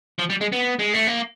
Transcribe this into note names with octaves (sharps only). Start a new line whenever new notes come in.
F3
G3
G#3
B3
G#3
A3
A#3